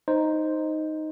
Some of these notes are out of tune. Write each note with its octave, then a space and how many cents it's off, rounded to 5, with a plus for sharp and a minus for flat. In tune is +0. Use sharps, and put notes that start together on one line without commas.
D#4 +0 C5 +0